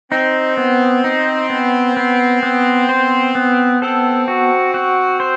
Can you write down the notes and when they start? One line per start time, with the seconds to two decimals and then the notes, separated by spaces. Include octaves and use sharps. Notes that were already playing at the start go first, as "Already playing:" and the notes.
0.12 C4 D#4
0.57 B3
1.04 D#4
1.50 B3
1.97 B3
2.43 B3
2.89 C5
3.35 B3
3.81 C4 A4
4.28 F#4
4.74 F#4
5.20 C5